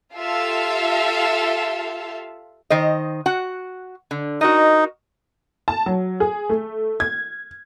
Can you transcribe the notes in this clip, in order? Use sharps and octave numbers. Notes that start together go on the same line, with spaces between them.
F4 G4 A4 E5 F5
D#3 C5 D#5
F#4 F#5
D3
D#4 F#4 A#4 D#5
A5
F#3
G#4
A3
G#6